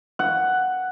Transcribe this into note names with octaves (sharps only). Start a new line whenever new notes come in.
F#5